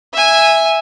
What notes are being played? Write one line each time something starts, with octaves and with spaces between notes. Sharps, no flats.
E5 G#5